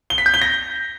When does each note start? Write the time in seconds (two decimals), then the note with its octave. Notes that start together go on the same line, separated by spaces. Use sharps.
0.10 G7
0.18 B6
0.26 G6
0.34 G7
0.42 A#6